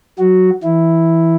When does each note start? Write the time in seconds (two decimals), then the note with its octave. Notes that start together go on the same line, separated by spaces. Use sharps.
0.19 F#3 F#4
0.63 E3 E4